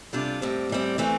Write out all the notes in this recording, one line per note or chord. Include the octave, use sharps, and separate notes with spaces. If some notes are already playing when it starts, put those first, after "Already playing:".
C3 G3 D4 F4 A4
A2 G3 C4
A2 G3 C4
E3 A3 C4